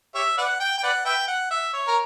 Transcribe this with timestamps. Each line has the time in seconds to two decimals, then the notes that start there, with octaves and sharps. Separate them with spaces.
0.15 G4 C#5 E5
0.38 B4 D5 F#5
0.60 G5
0.78 G5
0.83 B4 D5 F#5
1.05 B4 E5 G5
1.28 F#5
1.51 E5
1.73 C#5
1.87 A#4